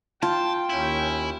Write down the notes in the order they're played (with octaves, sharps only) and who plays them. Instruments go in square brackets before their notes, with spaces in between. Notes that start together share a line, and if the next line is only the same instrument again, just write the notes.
[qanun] F4 [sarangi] G5 [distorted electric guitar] A5
[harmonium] D#2 C#4 [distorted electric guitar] E4